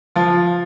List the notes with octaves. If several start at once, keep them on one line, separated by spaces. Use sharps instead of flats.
F3 F4